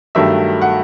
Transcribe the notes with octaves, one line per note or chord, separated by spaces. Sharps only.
G2 D#3 F#3 A3 E5
F#5